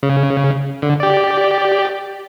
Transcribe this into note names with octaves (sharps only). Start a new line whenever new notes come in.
C#3
D3
G4 D5